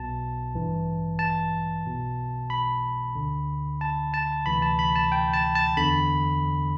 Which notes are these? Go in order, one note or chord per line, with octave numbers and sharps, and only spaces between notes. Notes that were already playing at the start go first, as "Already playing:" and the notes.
Already playing: B1 B2 A5
A1 G2 E3
A5
B1 B2
B5
D2 D3
A5
A5
D2 C3 E3 B5
A5
B5
A5
G5
A5
A5
E2 D3 B5